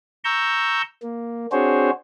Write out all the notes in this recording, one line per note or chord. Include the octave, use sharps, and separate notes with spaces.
A#5 C#6 E6 G6
A#3
C4 D4 F#4 G#4 C5 C#5